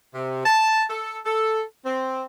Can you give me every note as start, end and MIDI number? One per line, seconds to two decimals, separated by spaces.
0.14 0.42 48
0.45 0.83 81
0.89 1.18 69
1.25 1.61 69
1.84 2.24 60